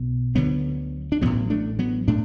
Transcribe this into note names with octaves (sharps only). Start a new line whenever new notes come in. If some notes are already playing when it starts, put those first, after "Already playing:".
Already playing: B1 B2
D2 D3 F#3 B3
D4
A1 A2 F#3 B3
A3 D4
F#3 B3
A2 A3 D4